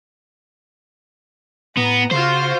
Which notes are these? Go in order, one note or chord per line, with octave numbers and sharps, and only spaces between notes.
A2 B3 A#5
C#3 F4 F#4 C5 F5